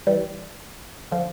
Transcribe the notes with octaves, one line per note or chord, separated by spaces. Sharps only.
E3 G3
D3 F3